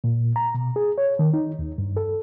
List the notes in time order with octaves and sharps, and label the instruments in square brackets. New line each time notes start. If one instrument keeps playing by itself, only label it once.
[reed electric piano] A#2
A#5
B2
G#4
C#5
D#3
D#4
D#2
G2
A4